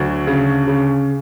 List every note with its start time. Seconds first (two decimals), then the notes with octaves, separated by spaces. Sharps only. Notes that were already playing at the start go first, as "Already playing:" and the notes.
Already playing: D2 F#3
0.27 C#3
0.67 C#3